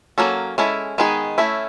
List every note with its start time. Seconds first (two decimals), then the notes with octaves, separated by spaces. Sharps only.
0.18 F#3 A#3 C#4 F#4 A4
0.58 G#3 C#4 E4 A4
0.98 D#3 G#3 B3 D#4 G#4
1.38 A3 C#4 E4